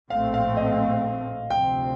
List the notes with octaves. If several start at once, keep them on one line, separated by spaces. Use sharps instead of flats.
A#1 A2 A3 C4 F5
F5
D#5
D2 C3 F3 C4 G5